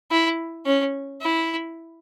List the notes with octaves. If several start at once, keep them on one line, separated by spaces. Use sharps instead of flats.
E4
C#4
E4